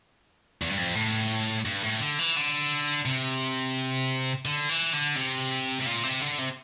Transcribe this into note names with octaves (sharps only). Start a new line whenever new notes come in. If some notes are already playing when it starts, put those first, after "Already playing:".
E2
G2
F2
A2
G2
A2
D3
E3
D3
C3
D3
E3
D3
C3
C3
A#2
C3
D3
C3